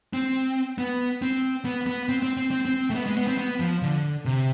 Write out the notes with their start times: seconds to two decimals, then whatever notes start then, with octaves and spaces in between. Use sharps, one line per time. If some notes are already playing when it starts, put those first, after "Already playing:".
0.13 C4
0.78 B3
1.22 C4
1.65 B3
1.86 B3
2.09 C4
2.23 C4
2.37 C4
2.51 C4
2.65 C4
2.90 A3
2.95 B3
3.06 G#3
3.17 B3
3.27 C4
3.38 B3
3.60 F3
3.82 D3
4.25 C3